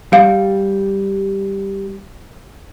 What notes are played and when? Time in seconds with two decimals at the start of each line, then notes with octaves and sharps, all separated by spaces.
0.13 G3 F5